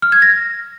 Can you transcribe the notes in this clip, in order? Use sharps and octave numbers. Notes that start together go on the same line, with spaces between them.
F6
G#6
A#6